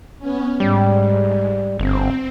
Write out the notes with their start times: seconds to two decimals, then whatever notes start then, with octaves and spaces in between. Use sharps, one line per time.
0.19 B3 C#4
0.60 G#2 G3
1.79 G1 C4